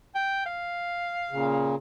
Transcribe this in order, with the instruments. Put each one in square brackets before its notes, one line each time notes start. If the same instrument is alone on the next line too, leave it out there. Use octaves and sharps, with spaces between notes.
[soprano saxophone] G5
F5
[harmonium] A#2 C#3